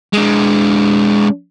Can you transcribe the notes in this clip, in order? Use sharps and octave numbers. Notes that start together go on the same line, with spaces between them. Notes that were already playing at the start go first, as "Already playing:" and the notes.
G#3 D4